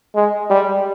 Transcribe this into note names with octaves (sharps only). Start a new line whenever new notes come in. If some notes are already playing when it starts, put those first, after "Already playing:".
G#3
G3